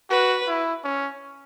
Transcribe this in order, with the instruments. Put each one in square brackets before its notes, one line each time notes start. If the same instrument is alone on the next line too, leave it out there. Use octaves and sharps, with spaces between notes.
[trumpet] F#4 [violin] B4
[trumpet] E4
C#4